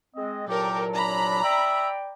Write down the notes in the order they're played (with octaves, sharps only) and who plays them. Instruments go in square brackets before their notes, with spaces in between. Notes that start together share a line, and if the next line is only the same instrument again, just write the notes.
[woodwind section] G#3 C4 [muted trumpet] D#5
[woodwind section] C2 A#2 F#3 [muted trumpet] G4 [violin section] A4 A#4
[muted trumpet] D4 [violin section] A#5 B5
[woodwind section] D5 G5 [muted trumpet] E5